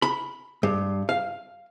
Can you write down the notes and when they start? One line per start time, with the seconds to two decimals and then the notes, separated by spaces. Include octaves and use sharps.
0.02 B5
0.63 G2
1.09 F5